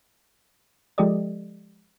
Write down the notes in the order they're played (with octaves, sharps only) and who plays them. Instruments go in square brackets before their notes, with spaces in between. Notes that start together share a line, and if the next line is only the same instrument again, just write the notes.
[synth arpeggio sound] F3 G#3 G4 A4 D5 D#5